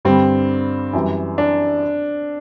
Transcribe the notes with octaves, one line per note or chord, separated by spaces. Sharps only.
G2 D3 G3 C4
F#2 E3 G3
D4